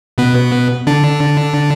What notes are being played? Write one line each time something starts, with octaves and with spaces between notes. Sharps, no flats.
B2 B3
D3 D4